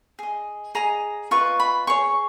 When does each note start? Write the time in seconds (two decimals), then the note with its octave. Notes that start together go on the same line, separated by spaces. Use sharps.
0.19 G#4 D#5
0.75 G#4 D#5 A#5
1.31 F4 B4 D#5 C#6
1.60 B5
1.87 G#4 C#5 C#6